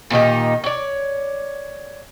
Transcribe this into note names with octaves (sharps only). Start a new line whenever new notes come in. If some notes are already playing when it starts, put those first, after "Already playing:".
A#2 D#3 D#4 G4
C#5 D5